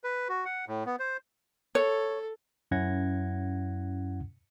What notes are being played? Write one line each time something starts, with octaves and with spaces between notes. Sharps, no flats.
B4
F#4
F#5
A2
B3
C5
A4 C#5
F#2 C#4 E4 F#5 G#6 A#6